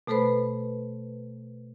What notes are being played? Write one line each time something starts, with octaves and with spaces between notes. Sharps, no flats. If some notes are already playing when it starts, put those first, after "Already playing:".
B2 A3 A4 B4 C5 B5